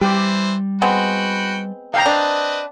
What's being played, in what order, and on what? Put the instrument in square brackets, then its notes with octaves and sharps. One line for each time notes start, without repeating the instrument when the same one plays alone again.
[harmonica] E3 C5 [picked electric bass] G3 [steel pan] G4
[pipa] G#3 B3 C4 [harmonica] F#4 G5 B5
[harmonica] D4 D#4 [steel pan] F5 G5 A#5
[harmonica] C4 B4 D#5 [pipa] D4